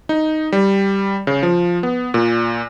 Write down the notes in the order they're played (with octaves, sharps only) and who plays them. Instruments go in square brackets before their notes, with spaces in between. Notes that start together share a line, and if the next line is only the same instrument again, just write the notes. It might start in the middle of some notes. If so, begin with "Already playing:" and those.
[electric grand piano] D#4
G3
C#3
F3
B3
A#2